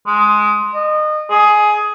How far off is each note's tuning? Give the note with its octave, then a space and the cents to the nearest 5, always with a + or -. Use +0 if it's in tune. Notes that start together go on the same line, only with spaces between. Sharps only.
G#3 +10
D#5 -25
G#4 +15